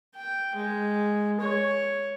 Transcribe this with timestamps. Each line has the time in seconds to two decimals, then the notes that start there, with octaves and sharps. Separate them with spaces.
0.15 G5
0.56 G#3
1.41 C#5